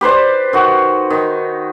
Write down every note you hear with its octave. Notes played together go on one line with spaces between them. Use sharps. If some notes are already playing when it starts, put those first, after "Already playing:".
G4 B4 C5 D5
D#3 F#4
D#3